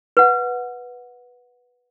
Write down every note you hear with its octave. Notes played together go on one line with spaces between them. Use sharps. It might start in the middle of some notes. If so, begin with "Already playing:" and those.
B4 F#5